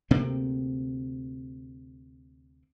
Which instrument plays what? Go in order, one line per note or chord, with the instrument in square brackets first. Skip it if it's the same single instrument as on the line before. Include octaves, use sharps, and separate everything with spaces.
[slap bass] D2 C3 A#3 C4